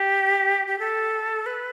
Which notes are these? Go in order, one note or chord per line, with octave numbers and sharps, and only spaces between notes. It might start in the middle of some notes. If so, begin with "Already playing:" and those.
Already playing: G4
G4
A4
B4